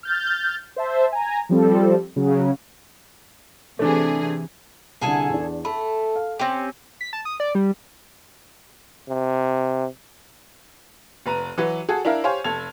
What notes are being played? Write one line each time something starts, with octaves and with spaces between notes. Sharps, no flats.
F6 G6 A6
C5 E5 A5
G#5 A#5
F3 G3 C4 A4
C#3 F#3
C3 E3 A3 D4 G#4
C2 D3 G#4 A4 G#5
E2 D4
A3 B5
F5
C4 C#4 G4 G5
B6
A5
D#6
D5
G3
C3
F1 B4 A#5 D#7
E3 F#3 F#4 B4
F#4 G#4 A4
D4 E4 A#4 E5 F5
G4 C5 C#5 F5 G#5
F1 A4 G#6 F7